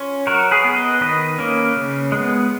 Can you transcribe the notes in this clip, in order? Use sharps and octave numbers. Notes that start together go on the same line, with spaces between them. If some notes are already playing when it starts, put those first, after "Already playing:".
Already playing: C#4 F4
F#3 F#4 A#4
G#4 B4
B3
B4 D#5
D#3 B4 D#5
A#3 C#4
C#3
G#3 B3